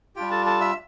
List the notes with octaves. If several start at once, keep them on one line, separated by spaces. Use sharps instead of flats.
G3 D4 F4 G4 G5
A4 A5
A4 A5
E5 E6